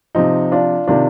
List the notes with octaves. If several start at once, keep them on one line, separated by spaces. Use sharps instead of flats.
C3 F3 C4 D#4
D4 F4
C3 D#3 D4 F4